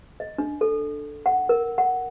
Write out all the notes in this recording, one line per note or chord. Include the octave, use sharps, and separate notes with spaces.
D#5
D4
A4
F#5
A#4
F#5